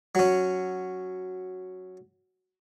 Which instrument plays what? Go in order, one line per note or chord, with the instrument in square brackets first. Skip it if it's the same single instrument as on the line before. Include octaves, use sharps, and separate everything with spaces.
[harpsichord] F#3 C#4